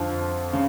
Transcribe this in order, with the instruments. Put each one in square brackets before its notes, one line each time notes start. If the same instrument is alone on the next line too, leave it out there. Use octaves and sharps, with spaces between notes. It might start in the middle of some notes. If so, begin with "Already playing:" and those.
Already playing: [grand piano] F2 D3 F3
C#3